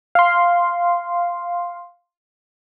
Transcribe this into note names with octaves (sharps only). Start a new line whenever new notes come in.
F5 C6